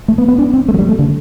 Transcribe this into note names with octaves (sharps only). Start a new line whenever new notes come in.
A3
B3
B3
D4
C4
A3
F#3
G3
A3
D3